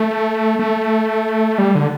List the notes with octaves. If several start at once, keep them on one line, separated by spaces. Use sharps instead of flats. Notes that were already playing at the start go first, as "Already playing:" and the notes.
Already playing: A3
A3
G3
D3